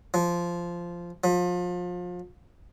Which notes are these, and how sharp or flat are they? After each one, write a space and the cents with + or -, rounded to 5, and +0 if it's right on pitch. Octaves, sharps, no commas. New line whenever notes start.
F3 -10
F3 +30